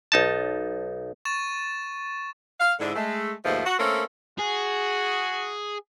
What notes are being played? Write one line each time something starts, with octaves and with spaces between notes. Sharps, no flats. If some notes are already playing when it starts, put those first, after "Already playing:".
B1 D#4 A5
C#6 A6 E7
F5
G#2 D3 E4
G#3 A3
D#2 G#2 B2 F3 A3
F#4
A3 A#3 C4 C#4 A4 A#4
F#4 G#4